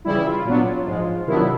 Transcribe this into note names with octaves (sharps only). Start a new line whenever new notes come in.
C#3 E3 G3 E4
F4
A#2 F#3 B3 D4
G#2 F3 G#3
C3 D#3 F#3 B3 D4 E4